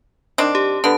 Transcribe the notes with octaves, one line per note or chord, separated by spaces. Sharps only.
D#3 C4 D4
G4
D3 B3 A5